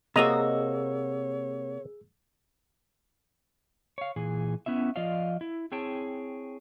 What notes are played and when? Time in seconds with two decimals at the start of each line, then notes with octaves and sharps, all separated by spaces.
0.16 C3 A#3 F#4 G#4 C#5 D#5 A#5 E6
3.98 C#5 F5
4.16 A#2 E3 G#4
4.66 B3 C#4 E4 E5
4.96 F3 F4 D5 D#5 F5
5.41 E4
5.72 C4 E4 G#4 C#5 G5 A5